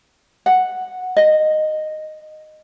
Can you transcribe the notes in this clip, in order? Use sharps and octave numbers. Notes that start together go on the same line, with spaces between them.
F#5
D#5